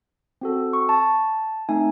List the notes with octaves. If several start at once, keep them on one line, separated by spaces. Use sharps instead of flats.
C4 F#4 A4
C#6
A5
A3 C4 D#4 G#5